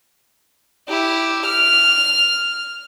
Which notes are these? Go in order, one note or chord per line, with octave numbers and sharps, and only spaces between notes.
E4 G4
F6